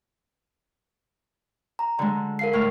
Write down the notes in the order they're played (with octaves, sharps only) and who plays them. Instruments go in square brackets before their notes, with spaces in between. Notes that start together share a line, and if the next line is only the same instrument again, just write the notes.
[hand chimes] A#5
[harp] D3 G#3
[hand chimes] A#4 F5 C7
[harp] A2 F6